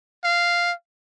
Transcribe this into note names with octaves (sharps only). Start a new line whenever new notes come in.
F5